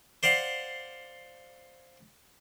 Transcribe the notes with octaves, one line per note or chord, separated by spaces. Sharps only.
C5 D5 F5 F#5